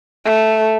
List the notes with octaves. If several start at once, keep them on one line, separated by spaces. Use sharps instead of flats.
A3